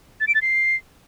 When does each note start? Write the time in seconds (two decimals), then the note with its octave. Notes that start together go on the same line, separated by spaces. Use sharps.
0.20 A6
0.28 D7
0.35 A6
0.42 C7